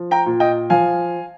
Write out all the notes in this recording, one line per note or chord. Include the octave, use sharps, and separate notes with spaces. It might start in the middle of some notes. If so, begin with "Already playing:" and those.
Already playing: F3
G5 A#5
A#2
D#5 G5
F3 F5 G#5